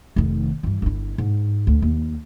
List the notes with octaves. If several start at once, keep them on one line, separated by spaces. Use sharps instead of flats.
F1 D#3
G2 E3
G1 E4
G#2
D2
D#2